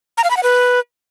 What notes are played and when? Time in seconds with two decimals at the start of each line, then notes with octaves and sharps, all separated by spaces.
0.17 A#5
0.24 F5
0.30 B5
0.37 F#5
0.43 B4